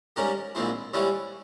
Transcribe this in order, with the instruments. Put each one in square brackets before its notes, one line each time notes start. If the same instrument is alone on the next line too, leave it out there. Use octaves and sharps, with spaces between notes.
[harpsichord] G#2 G3 C#4 G4 A#4
A#1 G#2 F3 C4 E4
G#2 E3 G3 C#4 E4